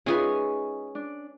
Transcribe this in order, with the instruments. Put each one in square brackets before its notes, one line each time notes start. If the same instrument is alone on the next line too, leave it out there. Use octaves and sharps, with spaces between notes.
[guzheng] G#3 G#4 B4 [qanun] C#4 G#5 [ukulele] D#4 F4 E5
[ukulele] D4